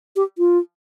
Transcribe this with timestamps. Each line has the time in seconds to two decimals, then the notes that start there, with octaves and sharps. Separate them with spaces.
0.16 G4
0.38 F4